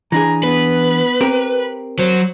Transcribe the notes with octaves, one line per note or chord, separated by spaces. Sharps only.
E3 D4 G#4 A#5
B3 B4
C4 G4 A#4
F#3 C5